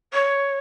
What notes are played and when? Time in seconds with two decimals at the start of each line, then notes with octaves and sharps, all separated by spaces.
0.13 C#5